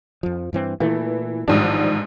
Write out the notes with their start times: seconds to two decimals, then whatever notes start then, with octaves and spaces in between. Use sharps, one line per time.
0.23 F2 F3
0.53 G2 E3 C4
0.80 A#2 E3 A3
1.48 A1 G#2 D#3 F3 G3 D4